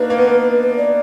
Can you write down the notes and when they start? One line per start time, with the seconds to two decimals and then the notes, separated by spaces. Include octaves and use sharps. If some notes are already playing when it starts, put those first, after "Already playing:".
Already playing: A#3 D4 D#4 F#4 B4
0.10 A#3
0.18 B3
0.27 A#3
0.77 D5